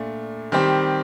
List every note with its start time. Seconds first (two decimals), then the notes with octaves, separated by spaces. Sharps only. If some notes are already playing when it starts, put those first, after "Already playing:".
Already playing: A#2 A3 D4
0.52 D#3 G3 C4 G4 C5